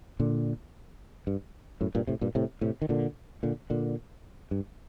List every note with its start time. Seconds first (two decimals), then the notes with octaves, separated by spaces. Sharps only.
0.20 A#2 D3
1.27 G2
1.81 F#2 A2
1.95 G2 A#2
2.07 A2 C3
2.21 G2 A#2
2.35 A2 C3
2.61 A2 C3
2.82 D#3
2.89 A#2 D3
3.43 A#2 D3
3.70 A#2 D3
4.51 G2